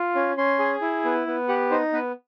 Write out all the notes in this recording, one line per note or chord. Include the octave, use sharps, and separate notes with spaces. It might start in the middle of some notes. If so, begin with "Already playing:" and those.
Already playing: F4
C#4
C#4 C6
G#4
E4
B3
B3
G4 F#5
D#4 C5
B3 B4